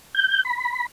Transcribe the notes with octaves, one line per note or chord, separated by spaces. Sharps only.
G6
B5